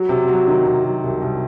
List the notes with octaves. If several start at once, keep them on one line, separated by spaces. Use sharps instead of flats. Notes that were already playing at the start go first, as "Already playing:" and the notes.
Already playing: F#3
C3
F#3
D#3
C3
F#3
C2
C2